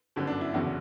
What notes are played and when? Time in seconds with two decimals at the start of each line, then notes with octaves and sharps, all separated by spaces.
0.16 G1 F#2 D3
0.27 D4
0.41 E4
0.54 F#1 E2 D3 F#4